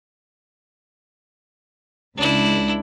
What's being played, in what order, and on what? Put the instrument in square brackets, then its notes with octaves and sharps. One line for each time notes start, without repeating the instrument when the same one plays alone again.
[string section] C#2 [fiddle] D4 E4